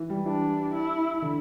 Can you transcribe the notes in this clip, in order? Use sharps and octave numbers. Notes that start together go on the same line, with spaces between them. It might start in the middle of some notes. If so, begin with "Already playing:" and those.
Already playing: E3
G3
E3 D4
E4
D3